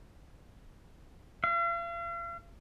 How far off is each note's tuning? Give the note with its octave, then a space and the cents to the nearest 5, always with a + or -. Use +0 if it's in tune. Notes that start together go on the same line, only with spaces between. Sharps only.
F5 -45